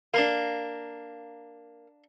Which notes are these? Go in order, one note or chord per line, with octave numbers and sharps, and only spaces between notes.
A#3 D4 A#4 F5